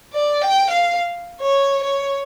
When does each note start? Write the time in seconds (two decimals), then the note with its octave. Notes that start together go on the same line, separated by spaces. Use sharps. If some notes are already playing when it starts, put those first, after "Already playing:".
0.13 D5
0.42 G5
0.71 F5
1.41 C#5
1.84 C#5